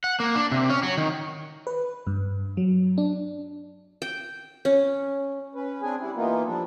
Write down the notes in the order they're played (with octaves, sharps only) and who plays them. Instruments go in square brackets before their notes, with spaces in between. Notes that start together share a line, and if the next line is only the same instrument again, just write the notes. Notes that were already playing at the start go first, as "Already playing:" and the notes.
[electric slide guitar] F#5
A#3
D4
C3
C#4
F#3
D#3
[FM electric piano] B4
G2
F#3
D4
[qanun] G5
C#4
[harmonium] C#4 B4
C4 D4 G#4 G#5
G3 E4
E3 A#3 B3 D#4 F4
F3 G3 D4 A4